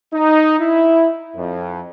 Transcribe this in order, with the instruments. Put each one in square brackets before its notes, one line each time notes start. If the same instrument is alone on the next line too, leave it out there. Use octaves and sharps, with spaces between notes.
[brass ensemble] D#4
E4
F2